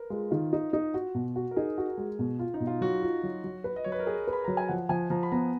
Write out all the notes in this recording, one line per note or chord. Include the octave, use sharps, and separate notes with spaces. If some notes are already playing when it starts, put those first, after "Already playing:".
Already playing: A#4 B4
G#3 F4
D#3 F4
D#4
D#4
F#4
B2
F#4
A#4
D#4 G#4
F#4
G#3
B2
F4
D#4
B2
F4
F#3 F#4
F4
F#3
F#3
B4
D#5
F#3 C#5
B4
A#4
G#4 B4
B4
B5
F#3 A#5
G#5
F3 F#5
F3 G#5
F3 A#5
B5
B3 A#5